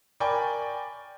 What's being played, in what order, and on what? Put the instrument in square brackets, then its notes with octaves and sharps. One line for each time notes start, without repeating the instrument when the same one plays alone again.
[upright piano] A#4 D5 G5 G#5 B5 C#6